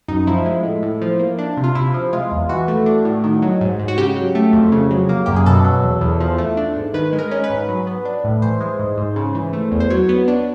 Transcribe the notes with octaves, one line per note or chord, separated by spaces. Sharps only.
F#2 D#4
F3 E4
G#3
A2
A2
F3
A#3
D4
C3
F4
C3 E4
F3
G#3 F4
E2
E3 F#4
A3
D4
A2
D#3
F#3
G#2
G#2
F#4
C#3 G4
F#3
A3
F2
C#3
F#3
A#3
F#2 G4
G#4
B2 A4
F#3
E2
E2
F3
A3
D4
G#2
D#3 B4
G#3
A#4
C#4
B4
G#2
F#3
B3
D4
A2
E3 C5
G#3
G#2
G#2
C#3
E3
A3
E2
C5
F#3 C#5
B3
D4